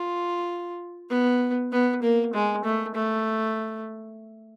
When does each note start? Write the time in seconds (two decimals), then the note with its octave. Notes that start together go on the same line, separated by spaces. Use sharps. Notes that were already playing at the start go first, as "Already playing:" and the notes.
Already playing: F4
1.09 B3
1.72 B3
2.03 A#3
2.33 G#3
2.65 A3
2.95 A3